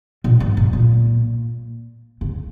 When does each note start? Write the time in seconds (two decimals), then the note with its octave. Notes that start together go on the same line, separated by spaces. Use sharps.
0.24 A#2
0.40 G#2
0.57 G#2
0.73 A#2
2.21 C#3